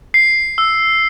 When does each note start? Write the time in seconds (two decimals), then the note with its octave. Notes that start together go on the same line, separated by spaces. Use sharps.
0.14 C7
0.58 E6